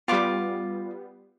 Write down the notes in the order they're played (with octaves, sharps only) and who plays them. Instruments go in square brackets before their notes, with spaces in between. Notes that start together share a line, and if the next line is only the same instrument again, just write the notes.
[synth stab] G3 B3 [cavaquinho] F4 D6